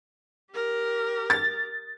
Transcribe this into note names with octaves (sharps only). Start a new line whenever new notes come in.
G4 A#4
A6